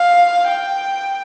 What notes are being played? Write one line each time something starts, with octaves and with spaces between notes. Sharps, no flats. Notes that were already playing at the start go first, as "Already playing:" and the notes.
Already playing: F5
G5